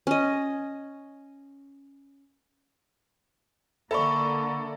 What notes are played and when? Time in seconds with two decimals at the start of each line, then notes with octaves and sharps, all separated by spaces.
0.07 C#4 D#5
3.91 D3 A#3 A4 D5 E5 B5 C#6